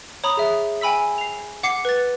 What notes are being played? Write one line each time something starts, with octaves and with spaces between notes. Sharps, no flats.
C#5 A#5 B5 D#6
G#4 E5
G5 G#5 B5 E6 B6
C7 F7
F#5 D6 C7 C#7
B4 A6